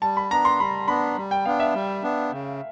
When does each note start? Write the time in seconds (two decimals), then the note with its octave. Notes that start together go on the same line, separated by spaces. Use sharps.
0.02 G3 A5
0.17 B5
0.31 B3 D4 A#5
0.45 C6
0.60 G3 B5
0.88 B3 D4 B5
1.17 G3
1.31 G5
1.46 B3 D4 F5
1.60 E5
1.75 G3
2.03 B3 D4
2.32 C#3